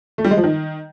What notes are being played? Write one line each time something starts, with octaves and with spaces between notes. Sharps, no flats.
A3
G3
G#3
F3
D#3